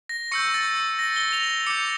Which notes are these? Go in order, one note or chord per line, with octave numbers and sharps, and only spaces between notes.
A#6
C#6 E6 G6 C#7
A6
A#6
G7
F7
D6 G6 C#7